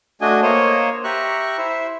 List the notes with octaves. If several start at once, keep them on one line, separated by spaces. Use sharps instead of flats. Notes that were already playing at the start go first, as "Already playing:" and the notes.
A3 D4 F#4 D#5 G#5
A#3 C5 C#5 D#5
G4 E5 A#5 C#6 F#6
E4 C5 E5